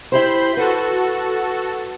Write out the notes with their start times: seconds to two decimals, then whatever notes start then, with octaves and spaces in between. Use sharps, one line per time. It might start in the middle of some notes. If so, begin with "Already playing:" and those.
0.12 E4 G4 C5 B5 C6 G6
0.57 F#4 A4 B4